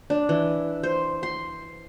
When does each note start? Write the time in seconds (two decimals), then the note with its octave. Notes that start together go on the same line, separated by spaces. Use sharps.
0.10 D4
0.29 E3
0.83 C5
1.23 C6